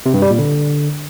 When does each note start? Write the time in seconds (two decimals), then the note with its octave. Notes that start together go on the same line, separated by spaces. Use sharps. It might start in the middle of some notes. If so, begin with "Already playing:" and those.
0.06 C3
0.14 G2
0.22 G3
0.30 A#2
0.38 D3